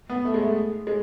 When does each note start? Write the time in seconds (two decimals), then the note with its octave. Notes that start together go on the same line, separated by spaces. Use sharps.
0.10 B3
0.25 A3
0.34 G#3
0.43 A3
0.87 G#3